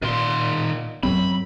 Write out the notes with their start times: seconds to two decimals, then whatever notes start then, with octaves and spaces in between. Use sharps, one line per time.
0.02 A#2 D#3 C6
1.03 F#2 F#3 C4 B5